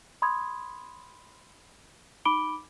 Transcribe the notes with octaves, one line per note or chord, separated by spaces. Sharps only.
B5 C6 D#6 G#6
D#4 B5 D6 D7 G7